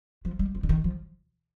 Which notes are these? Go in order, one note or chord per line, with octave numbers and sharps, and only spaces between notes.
F3
G3
F3
D3
D#3
F3